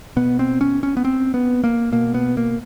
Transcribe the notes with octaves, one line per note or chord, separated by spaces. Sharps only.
B2 B3
C4
C#4
C#4
B3
C4
B3
A#3
B2 A#3
B3
A#3